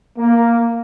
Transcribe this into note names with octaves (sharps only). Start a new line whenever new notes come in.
A#3